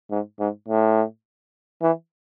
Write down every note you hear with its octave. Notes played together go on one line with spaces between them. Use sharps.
G#2
G#2
A2
E3